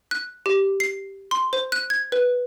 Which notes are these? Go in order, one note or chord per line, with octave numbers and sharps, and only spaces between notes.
F#6
G4
C7
C6
C5
F#6
G#6
B4